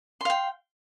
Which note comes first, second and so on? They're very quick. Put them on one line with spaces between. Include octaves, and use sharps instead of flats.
C6 F5 G5